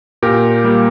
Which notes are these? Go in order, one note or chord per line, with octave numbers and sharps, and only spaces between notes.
A#2 G4 A#4
G3 A#3